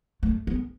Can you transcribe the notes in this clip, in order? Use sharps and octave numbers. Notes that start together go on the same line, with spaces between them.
A3
B3